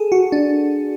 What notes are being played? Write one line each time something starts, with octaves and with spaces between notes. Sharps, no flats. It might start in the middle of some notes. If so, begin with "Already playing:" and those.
Already playing: G#4 A4
F#4
D4